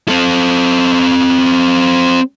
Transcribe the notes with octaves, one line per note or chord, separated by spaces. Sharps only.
C4 A4